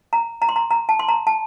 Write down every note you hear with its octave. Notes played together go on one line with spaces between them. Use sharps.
A#5
A#5
C6
A#5
A#5
A5
C6
A#5
A5